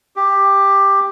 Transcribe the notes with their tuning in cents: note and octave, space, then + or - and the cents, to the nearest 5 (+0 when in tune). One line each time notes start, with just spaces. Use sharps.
G4 +10